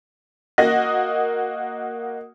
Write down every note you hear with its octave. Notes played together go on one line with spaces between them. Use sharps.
A#3 F#4 D#5 D#6 A#6